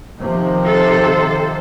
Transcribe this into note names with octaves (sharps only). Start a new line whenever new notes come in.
C3 D#3 F3
A4 C5